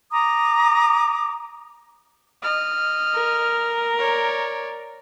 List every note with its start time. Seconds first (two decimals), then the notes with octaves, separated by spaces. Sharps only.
0.10 A#5 D6 D#6
2.42 D#5 F6
3.15 A#4
3.99 C#5 D5